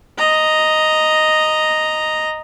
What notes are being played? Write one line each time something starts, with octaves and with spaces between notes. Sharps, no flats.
D#5 A#5